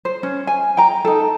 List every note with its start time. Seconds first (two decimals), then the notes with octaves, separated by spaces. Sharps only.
0.05 C5
0.23 C#4
0.47 G#5
0.77 G5 A#5
1.05 D#4 A4